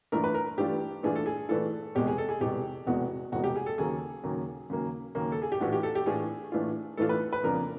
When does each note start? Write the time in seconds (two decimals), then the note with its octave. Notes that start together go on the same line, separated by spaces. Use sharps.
0.12 G2 E3 A3 D4 F4 A#4
0.24 B4
0.34 A#4
0.57 G2 E3 A3 D4 F4 G4
1.03 G2 E3 A3 D4 F4 G#4
1.16 A4
1.26 G#4
1.49 G2 E3 A3 D4 F4 A4
1.95 F1 E2 B2 G#3 G4
2.07 G#4
2.18 A4
2.29 G#4
2.40 F1 E2 B2 G#3 G4
2.87 F1 E2 B2 G#3 F#4
3.32 F1 E2 B2 G#3 F#4
3.44 G4
3.56 G#4
3.66 A4
3.78 D#2 C#3 F#3 A#3 G#4
4.24 D#2 C#3 F#3 A#3
4.70 D#2 C#3 F#3 A#3
5.15 D#2 C#3 F#3 A#3
5.32 A4
5.42 G#4
5.52 G4
5.60 A2 E3 A3 D4 F4 F#4
5.72 G4
5.83 A4
5.95 G4
6.06 A2 E3 A3 D4 F4 G#4
6.52 A2 E3 A3 D4 F4
6.97 A2 E3 A3 D4 F4 A4
7.09 B4
7.33 B4
7.43 F2 C#3 F3 A#3 D4 A#4